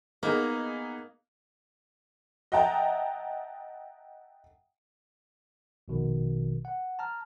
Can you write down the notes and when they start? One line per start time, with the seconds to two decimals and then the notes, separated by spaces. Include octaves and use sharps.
0.23 A#3 B3 D#4 G#4
2.52 D#5 E5 F#5 G5 A5 A#5
5.88 A#1 B2 D#3
6.65 F#5
6.99 A5 A#5 F6